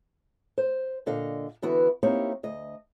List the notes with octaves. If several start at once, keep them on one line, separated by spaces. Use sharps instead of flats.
C5
A#2 D3 D#5 F5
D3 E3 B3 E4 F#4 B4
A#3 C4 D#4 E4 G4 C#5
D2 D#5